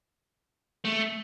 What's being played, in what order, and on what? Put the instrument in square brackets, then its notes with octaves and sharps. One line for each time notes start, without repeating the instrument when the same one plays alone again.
[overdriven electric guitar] A3